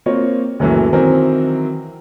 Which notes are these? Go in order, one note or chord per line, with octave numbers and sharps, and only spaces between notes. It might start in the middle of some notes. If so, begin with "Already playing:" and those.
A#3 C4 F4 C#5
C#2 F#2 A#2 E3 F#3 A3
D#3 E3 F#3 C4 A#4 C5